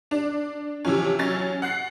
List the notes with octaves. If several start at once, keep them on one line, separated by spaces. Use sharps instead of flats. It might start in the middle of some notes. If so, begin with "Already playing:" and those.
D4
C3 E3 F3 C#4
F#3 C#4 A6
F#5 F#6 C7